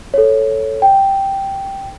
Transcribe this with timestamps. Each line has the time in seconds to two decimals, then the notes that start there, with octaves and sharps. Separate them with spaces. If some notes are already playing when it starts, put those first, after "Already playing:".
0.14 A4 C#5
0.82 G5